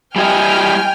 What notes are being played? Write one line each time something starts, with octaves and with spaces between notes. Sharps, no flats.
G3 E4 D#5 G5 G#5 F6